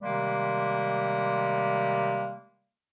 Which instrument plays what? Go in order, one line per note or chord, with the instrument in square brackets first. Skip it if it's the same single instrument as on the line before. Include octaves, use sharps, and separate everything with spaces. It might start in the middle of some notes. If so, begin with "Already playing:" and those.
[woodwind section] C3 D#3 G3 G#3 A#3